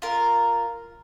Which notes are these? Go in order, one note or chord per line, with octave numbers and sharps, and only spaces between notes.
F4 A#4